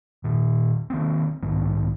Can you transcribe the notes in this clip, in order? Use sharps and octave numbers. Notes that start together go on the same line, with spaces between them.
A#2 D#3
D#3 A#3 C4
B1 G#2 D#3 B3